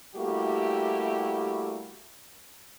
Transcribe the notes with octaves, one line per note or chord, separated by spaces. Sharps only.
G3 A3 A#3 E4 F#4 G4